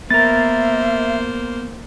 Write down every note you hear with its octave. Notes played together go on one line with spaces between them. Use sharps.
A#3 B3 A#4 C5 E5 A6